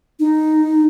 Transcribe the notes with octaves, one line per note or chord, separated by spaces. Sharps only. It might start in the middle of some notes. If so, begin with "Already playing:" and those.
D#4